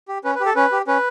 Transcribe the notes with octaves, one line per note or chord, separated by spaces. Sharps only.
G4
C#4 B4
B4
G4
A4
C#4 B4
G4
C#4 B4